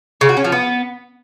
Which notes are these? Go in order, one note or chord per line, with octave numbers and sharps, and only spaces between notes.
C#3
F#4
C#4
F3
B3